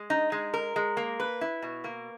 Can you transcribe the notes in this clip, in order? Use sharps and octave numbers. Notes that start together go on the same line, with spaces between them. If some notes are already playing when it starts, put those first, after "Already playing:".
Already playing: G#3
D#4
G#3
A#4
G#3
A#3
B4
E4
B2
A#3